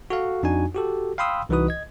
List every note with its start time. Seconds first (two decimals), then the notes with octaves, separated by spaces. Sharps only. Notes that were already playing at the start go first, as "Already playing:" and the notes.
0.10 F#4 A4 F5
0.43 F2 D4 D#4 F#4 G#5
0.75 F#4 G4 A4
1.18 F5 G5 B5 C6 D#6 E6
1.49 C2 E3 D#4 F#4 B4 D#6
1.68 D#5 G#6